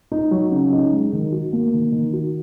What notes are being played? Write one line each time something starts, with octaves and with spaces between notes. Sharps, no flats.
D#4
F#3
C#3
D#4
G#3
D#3
F#4
A#3
D#3
D#3
F#4